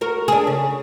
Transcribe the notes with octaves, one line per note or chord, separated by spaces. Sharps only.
F#4 A#4
D4 G#4
C#3